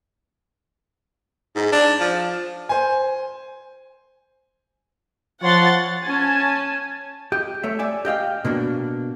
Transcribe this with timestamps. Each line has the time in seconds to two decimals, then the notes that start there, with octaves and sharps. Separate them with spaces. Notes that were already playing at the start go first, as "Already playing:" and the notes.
1.56 G#2
1.72 D4
2.00 F3
2.69 C5 G#5
5.42 F3 C#5 F#5 C6 A6
6.05 C#4 G#5 A5
7.32 G4 D#5
7.63 A3 A4 C#5 E5
7.79 D5 E5 G#5
8.05 G4 D#5 F5 G5
8.45 B2 A#3 D4 F#4